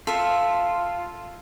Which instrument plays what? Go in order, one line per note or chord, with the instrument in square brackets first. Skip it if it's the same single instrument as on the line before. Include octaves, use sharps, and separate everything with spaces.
[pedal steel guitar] F4 [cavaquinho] A4 E5